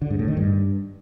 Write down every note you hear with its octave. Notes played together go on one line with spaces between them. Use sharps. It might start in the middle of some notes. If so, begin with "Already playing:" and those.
D3
G#2
A2
D#3
G2